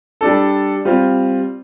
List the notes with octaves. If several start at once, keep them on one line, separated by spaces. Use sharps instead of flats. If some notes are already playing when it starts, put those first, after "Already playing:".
G3 D4 A4
G3 C4 F4